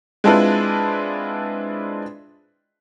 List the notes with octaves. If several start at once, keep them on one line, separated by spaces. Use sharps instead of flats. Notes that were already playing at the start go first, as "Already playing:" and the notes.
G#3 C4 D4 E4 F4 B4